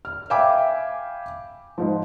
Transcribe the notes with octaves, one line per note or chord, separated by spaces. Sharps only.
F6
E5 F5 G5 G#5 B5 D6
G#2 F3